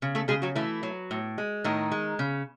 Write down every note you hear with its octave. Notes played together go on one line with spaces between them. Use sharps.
C#3
A3 A4
C#3 G#3 G#4
F#3 F#4
E3 A3 E4
F#3
A2
G#3
A2 D#3 D#4
G#3
C#3